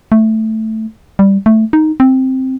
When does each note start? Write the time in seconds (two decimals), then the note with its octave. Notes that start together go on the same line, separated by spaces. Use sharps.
0.12 A3
1.19 G3
1.46 A3
1.73 D#4
2.00 C4